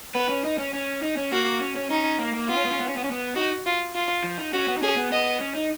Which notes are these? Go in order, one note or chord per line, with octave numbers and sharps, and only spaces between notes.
B3 B4
C#4
D#4
C#4
C#4
D#4
C#4
A#3 F#4
C#4
C#4
C#4 D#4
A#3
A#3
B3 F4
C#4
B3
C#4
B3
C#4
B3
C#4
B3
D#4 F#4
F4
F4
F3
D#4
C#4 F#4
B3
D#4
C#4 G#4
B3
B3 D#5
C#4
D#4